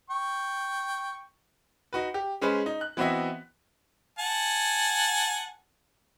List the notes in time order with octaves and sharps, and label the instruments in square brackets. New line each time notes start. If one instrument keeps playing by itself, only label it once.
[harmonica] G5 C#6
[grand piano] D#4 F#4 B4
G4
G#3 C#4 G#4 B4 C5
D#4
F#6
E3 B3 C4 F#4 D#5 E5
[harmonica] F#5 G#5 A5